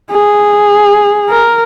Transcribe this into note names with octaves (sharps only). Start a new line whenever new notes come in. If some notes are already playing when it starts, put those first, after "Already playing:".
G#4
A#4